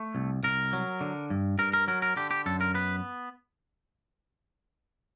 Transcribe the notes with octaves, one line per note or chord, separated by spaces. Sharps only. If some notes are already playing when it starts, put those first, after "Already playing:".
Already playing: A3
C2
C2 A#4
F#3
D3
G2
G2 A#4
A#4
F#3 A#4
A#4
D3 G4
G4
F#2 A4
A#4
B3 B4